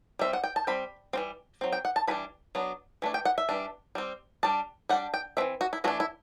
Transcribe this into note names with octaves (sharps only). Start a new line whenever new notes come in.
G3 C4 E5
F#5
G5
A5
G3 C4 B5
E3 G3 C4
F#3 C4
G5
F#5
A5
E3 G3 D4 B5
F#3 B3 D4
E3 A3 D4
G5
F#5
E5
E3 G3 D4
G3 C4
G3 D4 A5
G3 D4 F#5
G5
E3 A3 C4 E5
F#4
E4
E3 A3 D4 F#4
E4